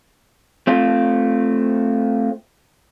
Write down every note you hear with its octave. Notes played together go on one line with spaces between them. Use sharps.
A3 C4 F4